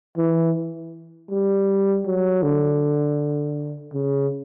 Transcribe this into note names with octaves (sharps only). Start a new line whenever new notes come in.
E3
G3
F#3
D3
C#3